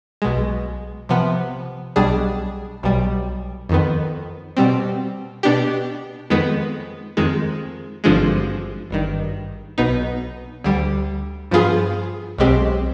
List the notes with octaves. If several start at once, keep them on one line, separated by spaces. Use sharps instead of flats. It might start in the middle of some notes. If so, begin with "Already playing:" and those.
B1 B2 G#3
C3 F3 B3
B1 B2 G3 D4 G#4
B1 B2 G3
F2 D#3 B3
B2 G3 C4
B2 B3 D4 G4
F2 D#3 G#3 B3
F2 D#3 G#3
G#1 G2 D3 F3 G#3
G#1 G2 D#3
B1 B2 B3 D#4
D2 D3 G3
G2 F3 B3 F4 G#4
B1 B2 G#3 C4 G4